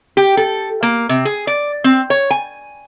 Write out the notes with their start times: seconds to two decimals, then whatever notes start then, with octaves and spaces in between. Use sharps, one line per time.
0.17 G4
0.37 A4
0.83 A#3
1.09 C3
1.25 G#4
1.47 D5
1.84 C4
2.10 C#5
2.30 G#5